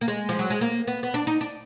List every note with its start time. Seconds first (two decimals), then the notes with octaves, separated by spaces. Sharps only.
0.01 A#3
0.08 G#3
0.29 F3
0.39 F#3
0.50 G#3
0.61 A#3
0.87 B3
1.03 B3
1.14 D4
1.27 D#4
1.41 D4